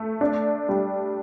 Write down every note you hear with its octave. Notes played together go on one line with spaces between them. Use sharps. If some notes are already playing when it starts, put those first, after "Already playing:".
Already playing: A3
D4
G3